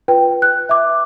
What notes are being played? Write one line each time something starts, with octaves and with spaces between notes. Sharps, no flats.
F4 B4 G5
F#6
E5 D6